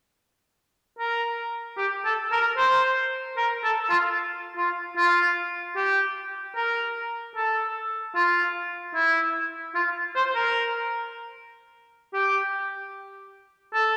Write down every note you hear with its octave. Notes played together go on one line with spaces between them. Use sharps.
A#4
G4
A4
A#4
C5
A#4
A4
F4
F4
F4
G4
A#4
A4
F4
E4
F4
C5
A#4
G4
A4